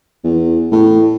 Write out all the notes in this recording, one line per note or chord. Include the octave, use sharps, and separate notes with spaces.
E2
A2